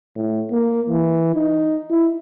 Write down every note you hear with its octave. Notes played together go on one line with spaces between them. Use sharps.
A2
A#3
E3
D#4
E4